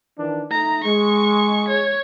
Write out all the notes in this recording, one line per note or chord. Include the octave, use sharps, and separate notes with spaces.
D#3 E3 D4
A3 D#4 A#5
G#3 C#6
C#5